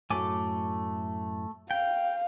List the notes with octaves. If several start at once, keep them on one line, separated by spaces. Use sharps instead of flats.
F#2 A2 A3 A4 G#5 D6
F5 G5